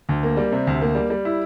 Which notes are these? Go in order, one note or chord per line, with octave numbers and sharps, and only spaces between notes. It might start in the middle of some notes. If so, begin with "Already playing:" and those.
D2
A#3
G3
C3
D2
A#3
G3
G3
E4